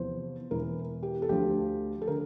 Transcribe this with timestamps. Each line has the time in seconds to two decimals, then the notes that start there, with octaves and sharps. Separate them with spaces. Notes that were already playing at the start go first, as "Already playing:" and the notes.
Already playing: E2 C3 F3 C5
0.51 E1 E2 E3 A#4
1.03 G4
1.22 A4
1.29 D2 D3 F3 G4
2.01 A4
2.07 D3 A#4